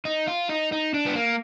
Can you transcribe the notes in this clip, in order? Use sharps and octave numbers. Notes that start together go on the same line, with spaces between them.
D#4
F4
D#4
D#4
D4
B3
A#3